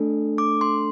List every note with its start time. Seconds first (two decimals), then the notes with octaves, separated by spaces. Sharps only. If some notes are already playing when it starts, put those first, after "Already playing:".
Already playing: A3 D4 A4
0.38 D6
0.61 C6